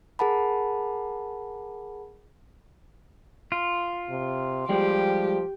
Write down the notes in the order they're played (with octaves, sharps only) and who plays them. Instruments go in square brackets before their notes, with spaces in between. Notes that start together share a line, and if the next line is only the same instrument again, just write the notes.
[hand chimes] G#4 A#4 F#5 A5 B5
[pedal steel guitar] F4
[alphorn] C3
[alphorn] F3 [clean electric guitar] G3 G#3 [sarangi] G4